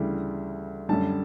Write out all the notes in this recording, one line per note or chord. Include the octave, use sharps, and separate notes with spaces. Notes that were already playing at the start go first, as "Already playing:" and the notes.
Already playing: D2 C#3 E3 G3
F#2 D3 G3 A5